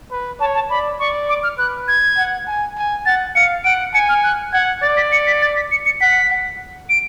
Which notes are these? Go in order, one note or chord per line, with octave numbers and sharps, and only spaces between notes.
B4
C#5 A5
A5
D5 B5
D5 C#6
D6
F6
B4 F#6
G#6
F#5
G#5
G#5
F#5 A6
F5 C#7
F#5 D7
G#5 C#7
F6
F#6
F#5 G#6
D5 A6
B6
C#7
B6
A6
B6
C#7
C#7
F#5 B6
F#5
D7